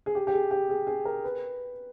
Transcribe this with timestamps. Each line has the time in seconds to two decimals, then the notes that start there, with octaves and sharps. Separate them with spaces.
0.06 G#4
0.15 G4
0.27 G4
0.34 G#4
0.51 G4
0.70 G#4
0.87 G#4
1.05 A#4
1.24 B4